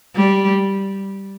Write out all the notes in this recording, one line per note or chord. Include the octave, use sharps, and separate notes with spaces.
G3